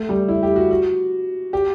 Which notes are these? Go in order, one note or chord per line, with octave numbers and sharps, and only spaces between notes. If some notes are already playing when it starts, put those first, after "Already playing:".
Already playing: A3
G3
E4
G4
F#4
F#4
G4